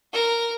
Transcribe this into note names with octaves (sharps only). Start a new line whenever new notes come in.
A#4